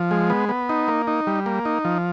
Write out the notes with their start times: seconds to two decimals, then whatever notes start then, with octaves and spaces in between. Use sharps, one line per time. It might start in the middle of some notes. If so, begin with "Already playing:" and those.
Already playing: F3
0.11 G#3
0.30 B3
0.49 B3
0.69 D#4
0.88 A#3
1.07 D#4
1.27 G3
1.46 A#3
1.65 D#4
1.85 F3